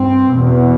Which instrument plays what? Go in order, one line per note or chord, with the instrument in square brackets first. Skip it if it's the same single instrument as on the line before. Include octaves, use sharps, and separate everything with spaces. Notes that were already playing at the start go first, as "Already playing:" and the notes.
Already playing: [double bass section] G2 C4
B2
E2